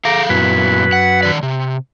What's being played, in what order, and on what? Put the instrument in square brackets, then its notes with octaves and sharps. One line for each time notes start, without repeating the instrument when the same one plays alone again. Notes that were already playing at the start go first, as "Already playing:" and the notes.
[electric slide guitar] G#4 A4 F5 [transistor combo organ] A#5 D6
[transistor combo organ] F#2 B4 [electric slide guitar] A#2 B3 E4
[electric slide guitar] F#5
D#3 D5
C3